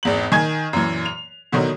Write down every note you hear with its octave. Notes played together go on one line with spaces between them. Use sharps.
G#1 E2 F#7
D#3 G#5 G#6
F#2 A#2 E3
F7
B2 D3 D#3 F#3